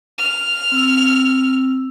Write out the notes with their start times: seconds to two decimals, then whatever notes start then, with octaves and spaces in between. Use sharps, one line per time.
0.18 F6
0.72 C4 E6